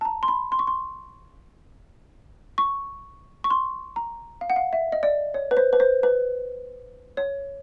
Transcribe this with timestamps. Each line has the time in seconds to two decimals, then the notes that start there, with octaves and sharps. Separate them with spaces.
0.01 A5
0.05 A#5
0.23 C6
0.28 B5
0.52 C6
0.59 C#6
0.67 C6
2.58 C#6
3.44 C#6
3.50 C6
3.96 A#5
4.41 F5
4.50 F#5
4.56 F5
4.73 E5
4.92 D#5
5.03 D5
5.34 C#5
5.51 B4
5.57 C5
5.73 B4
5.80 C5
6.03 B4
7.17 C#5